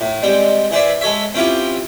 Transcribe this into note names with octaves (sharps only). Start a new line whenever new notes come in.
A2
G3 G#3 C4
E3 G#4 C5 D5 E5
G#3 A4 C#5 E5
C4 C#4 E4 F4 G4